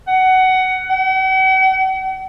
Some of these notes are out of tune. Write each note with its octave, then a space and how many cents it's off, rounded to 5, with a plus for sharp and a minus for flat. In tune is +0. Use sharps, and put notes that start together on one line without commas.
F#5 +15
F#5 +45